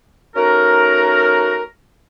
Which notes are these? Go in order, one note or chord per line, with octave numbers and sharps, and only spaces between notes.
A3 C#4 D#4 F#4 A#4